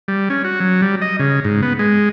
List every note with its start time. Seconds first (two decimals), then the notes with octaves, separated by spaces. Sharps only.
0.08 G3
0.30 C#4
0.45 F#4
0.60 F#3
0.82 G3
1.02 D#5
1.19 C#3
1.44 G#2
1.62 B3
1.79 G#3